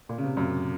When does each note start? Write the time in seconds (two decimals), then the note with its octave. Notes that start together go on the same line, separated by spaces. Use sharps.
0.09 A#2
0.18 C#3
0.24 C3
0.37 F#2